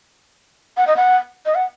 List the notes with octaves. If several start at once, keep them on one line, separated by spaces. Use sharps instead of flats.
F#5
D#5
F#5
D#5
F#5